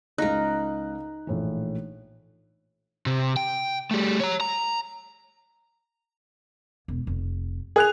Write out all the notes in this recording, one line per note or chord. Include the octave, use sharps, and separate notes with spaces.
C#2 D#4 A#4 F5 F#6
A#1 A2 E3
C3
G5
G3 A3
C#5 A#5
A#5
E1
F1
G#4 F#6 F7